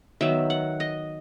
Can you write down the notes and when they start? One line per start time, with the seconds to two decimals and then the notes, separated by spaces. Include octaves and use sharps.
0.21 D#3 F#3 B3 E5
0.50 F#5
0.80 D#5